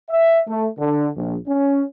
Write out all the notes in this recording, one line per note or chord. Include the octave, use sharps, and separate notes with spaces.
E5
A3
D3
A#1
C#4